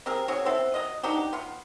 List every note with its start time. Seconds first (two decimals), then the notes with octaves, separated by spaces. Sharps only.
0.06 C4 G4 G#4 A#4
0.28 C4 F#4 G#4 C#5
0.46 B3 C4 E4 A4
0.74 F#3 D#5
1.03 D4 D#4 F#4 G4
1.33 B3 F4